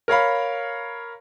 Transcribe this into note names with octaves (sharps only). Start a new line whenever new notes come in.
A#4 C#5 F5 B5